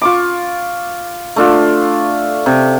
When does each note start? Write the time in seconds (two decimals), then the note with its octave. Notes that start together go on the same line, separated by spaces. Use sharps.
0.02 F4 C#6 D6
1.36 A3 D4 F4
2.46 C3